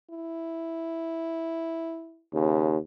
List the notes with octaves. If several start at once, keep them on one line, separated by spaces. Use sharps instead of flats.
E4
D#2 C#3